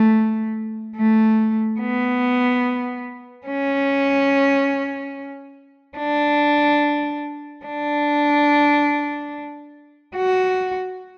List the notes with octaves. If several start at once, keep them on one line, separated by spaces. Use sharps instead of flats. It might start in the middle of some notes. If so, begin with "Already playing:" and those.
Already playing: A3
A3
B3
C#4
D4
D4
F#4